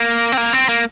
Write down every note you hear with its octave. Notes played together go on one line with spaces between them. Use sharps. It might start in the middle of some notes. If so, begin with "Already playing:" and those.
Already playing: A#3
C4
A#3
C4
A#3